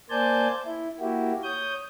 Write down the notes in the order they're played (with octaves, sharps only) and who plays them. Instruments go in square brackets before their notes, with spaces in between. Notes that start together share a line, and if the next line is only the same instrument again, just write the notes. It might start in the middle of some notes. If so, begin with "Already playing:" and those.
[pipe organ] A#3 C5 D5 G#5 A5 G6
E4
A#3 E4 F#4 G4
C#5 D#6 G6